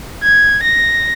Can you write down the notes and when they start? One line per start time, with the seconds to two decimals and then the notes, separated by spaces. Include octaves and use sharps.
0.23 G#6
0.63 A#6